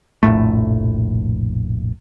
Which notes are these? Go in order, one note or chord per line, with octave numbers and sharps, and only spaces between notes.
F1 A#1 A2 A3